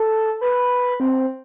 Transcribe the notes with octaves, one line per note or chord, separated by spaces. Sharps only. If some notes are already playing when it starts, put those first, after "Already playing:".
Already playing: A4
B4
C4